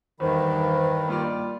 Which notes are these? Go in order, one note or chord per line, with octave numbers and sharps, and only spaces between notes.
E2 G2 D#3 C5 B5
G3 A#3 F4 D5